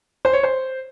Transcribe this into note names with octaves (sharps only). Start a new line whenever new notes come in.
C5
C#5
C5